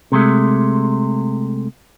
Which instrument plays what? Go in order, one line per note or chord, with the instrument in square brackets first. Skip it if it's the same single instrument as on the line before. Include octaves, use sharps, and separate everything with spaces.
[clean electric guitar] C3 G#3 A3